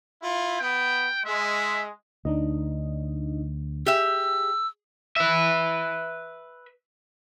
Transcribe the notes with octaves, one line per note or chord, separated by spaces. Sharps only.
E4 F4
B3 G5
G#3 E5
D2 D4 D#4 D#5
G4 G#4 E5 E6
B4 E5